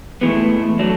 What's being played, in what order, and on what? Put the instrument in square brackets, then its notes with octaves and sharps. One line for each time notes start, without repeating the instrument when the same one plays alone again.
[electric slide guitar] A2 E3 G#3 B3 [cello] A3
[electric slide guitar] F#3 A3 D4